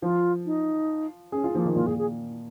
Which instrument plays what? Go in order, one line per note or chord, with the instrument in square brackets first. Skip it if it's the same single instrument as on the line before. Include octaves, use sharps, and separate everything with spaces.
[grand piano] F3 [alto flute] F4
[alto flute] D#4
[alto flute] C#4 [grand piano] G#4
[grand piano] F4
[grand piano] F3 [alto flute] A#3
[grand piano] D#3
[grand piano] A#2 [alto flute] F4
[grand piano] A#2 [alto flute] G#4
[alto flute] G#4